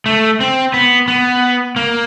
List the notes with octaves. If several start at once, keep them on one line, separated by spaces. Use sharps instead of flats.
A3
C4
B3
B3
A#3